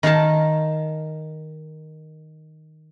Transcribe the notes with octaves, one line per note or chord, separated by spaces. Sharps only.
D#3 A#4 F5 A5